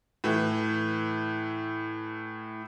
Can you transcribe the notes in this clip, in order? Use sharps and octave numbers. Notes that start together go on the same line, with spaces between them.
A2 E3